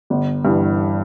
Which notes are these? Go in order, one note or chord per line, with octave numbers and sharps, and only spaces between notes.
G1
G2 E3